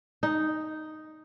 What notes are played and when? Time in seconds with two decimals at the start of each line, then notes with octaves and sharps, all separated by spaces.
0.23 D#4